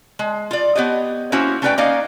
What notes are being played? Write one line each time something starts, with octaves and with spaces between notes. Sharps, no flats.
G#3
F4 D5
B3 G4 C#5 D#5
A#3 C#4 E4 F#4 C5
A3 C#4 D#4 B4 D5 G5
A#3 C#4 D#4 D5 D#5 F5